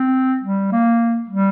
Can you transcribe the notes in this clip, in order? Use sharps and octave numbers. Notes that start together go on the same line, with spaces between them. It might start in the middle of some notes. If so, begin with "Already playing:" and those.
Already playing: C4
G3
A#3
G3